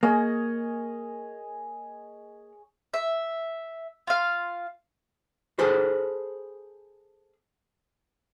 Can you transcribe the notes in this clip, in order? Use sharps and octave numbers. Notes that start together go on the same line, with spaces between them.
A#3 G#4 C#5 D#5
E5
F4 F5
G#4 A4 B4 C5